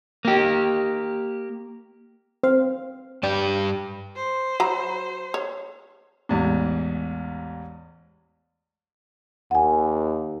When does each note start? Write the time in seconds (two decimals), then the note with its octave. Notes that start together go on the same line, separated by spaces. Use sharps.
0.25 A#3 G4
2.43 C4 F5
3.23 G2 G4 D5
4.16 C5
4.60 F#3 A#5 B5
5.34 C#5
6.29 A1 E2 G#2
9.51 D#2 F#5 G#5